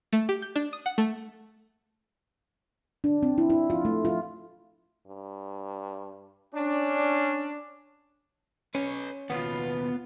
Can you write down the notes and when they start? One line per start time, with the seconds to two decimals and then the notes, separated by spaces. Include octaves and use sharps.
0.13 A3
0.29 G4
0.42 G6
0.56 D4
0.73 D#6
0.86 F#5
0.98 A3
3.04 D4
3.23 C4
3.38 E4
3.50 E4
3.70 F4
3.85 A3
4.05 F4
5.08 G2
6.55 C#4 D4
8.75 C#4 B4 C#5
9.30 D#2 B2 B3 F4